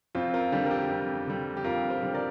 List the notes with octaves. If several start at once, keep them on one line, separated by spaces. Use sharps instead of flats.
F2 C4 F4
F4 A#4
D3 G3 D4 G4
A#4
D4 G4
F2
D3 G3
G4
F2 F4 A#4
G4 C5
D3 G3
A#4 D5